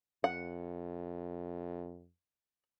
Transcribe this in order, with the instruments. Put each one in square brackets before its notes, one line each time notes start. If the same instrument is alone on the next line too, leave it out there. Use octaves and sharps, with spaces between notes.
[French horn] F2 [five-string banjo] F#5